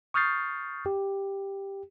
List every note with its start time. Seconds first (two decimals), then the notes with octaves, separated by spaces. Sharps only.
0.14 C#6 D#6 F6 G6 A6 C7
0.86 G4